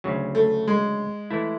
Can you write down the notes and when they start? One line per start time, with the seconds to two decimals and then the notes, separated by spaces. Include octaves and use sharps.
0.04 D2 C#3 F#3
0.35 A3
0.68 G#3
1.30 E3 A3 E4